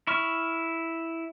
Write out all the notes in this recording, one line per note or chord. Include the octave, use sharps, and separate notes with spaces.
E4 C#6 F6